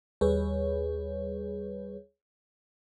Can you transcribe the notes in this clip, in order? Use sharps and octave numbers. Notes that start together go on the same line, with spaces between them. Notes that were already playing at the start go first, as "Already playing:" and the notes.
D#2 G3 G#4 B4 C#5